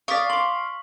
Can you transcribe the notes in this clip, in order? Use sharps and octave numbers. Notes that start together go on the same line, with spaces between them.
D5 F5 C#6 D#6 B6
C6 D6 F#7